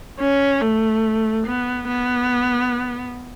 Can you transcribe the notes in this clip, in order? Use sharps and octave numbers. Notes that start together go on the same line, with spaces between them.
C#4
A3
B3
B3